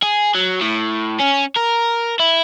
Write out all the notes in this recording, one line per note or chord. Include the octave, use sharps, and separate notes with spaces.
G#4
F#3
A2
C#4
A#4
E4